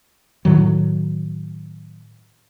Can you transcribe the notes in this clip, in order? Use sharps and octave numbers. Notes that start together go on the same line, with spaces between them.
A2 D#3 F#3